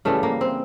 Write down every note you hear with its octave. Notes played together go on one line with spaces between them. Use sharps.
C#3 E3 G3 A3
A#3
C4